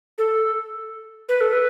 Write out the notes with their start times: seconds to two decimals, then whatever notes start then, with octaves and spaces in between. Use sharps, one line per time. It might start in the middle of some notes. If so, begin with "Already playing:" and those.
0.18 A4
1.29 B4
1.41 A4
1.53 B4